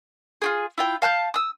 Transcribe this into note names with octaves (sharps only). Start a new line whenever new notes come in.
F4 G4 G#4
E4 F4 G5
F5 A5 F#6 G6
D#6 E6